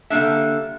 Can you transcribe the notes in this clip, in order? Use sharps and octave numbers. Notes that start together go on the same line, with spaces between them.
D3 G3 A#3 D4 E5